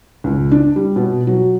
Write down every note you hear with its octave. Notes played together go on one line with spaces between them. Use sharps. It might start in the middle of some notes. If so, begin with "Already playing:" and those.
C#2
D4
G3
B2
F#3